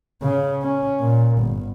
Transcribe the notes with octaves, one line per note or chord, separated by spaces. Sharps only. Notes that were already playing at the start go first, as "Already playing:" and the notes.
C#3
C#4
A#2
G1